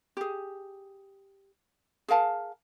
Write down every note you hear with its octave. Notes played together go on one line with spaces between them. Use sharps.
G4 G#4
G#4 A#4 F5 A5